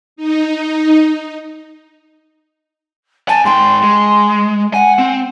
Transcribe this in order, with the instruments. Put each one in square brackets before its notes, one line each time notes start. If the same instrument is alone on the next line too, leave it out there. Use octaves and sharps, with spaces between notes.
[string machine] D#4
[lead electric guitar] F#5 G#5 [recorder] A5
[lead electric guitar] G#2 G5 [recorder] C6
[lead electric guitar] G#3
[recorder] F#5 [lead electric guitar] G#5
[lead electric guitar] C4